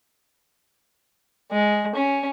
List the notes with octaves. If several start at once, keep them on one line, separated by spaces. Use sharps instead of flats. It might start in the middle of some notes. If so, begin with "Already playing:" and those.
G#3
C#4